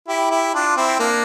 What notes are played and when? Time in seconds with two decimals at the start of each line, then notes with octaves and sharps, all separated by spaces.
0.08 E4 G4
0.31 E4 G4
0.54 D4 F4
0.77 C4 E4
1.00 A#3 D4